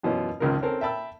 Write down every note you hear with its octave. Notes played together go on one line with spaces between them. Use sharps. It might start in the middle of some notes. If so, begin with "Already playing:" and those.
F#2 B2 E3 C#4 F4
G#1 C#2 C#3 F3 A#4
C4 C#4 A4 A#4
E5 G5 A5 B5 E6